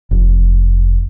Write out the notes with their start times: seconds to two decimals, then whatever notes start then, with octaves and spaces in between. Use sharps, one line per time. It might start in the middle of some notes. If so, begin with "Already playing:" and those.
0.11 F1